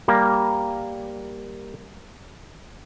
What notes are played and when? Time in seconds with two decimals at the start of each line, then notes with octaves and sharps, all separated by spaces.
0.08 G3 A#3